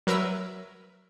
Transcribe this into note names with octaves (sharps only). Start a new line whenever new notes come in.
F#3 A#4 B4 E5 E6